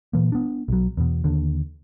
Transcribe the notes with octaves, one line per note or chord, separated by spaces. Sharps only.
A#2 E3 A#3
B3 D4
B1 F#3
E2 B2
D#2 D3